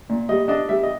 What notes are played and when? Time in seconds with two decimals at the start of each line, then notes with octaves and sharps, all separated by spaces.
0.09 A#2
0.29 G3 D#5
0.48 D4 D#5
0.69 G3 E5
0.83 D#5